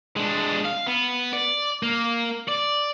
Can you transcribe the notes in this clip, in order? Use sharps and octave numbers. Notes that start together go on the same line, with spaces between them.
G#3 D4
F5
B3
D5
A#3
D5